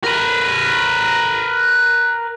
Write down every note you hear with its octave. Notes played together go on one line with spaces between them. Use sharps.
A#4 B4